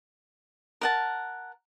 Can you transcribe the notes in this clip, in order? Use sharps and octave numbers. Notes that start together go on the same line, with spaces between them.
A#4 F#5 A5